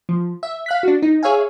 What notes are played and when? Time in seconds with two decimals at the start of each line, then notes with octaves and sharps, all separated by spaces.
0.09 F3
0.43 E5
0.66 F5 F#6 B6
0.83 D4 F#4
1.02 D#4
1.23 G#4 C#5 E5 F5 G#5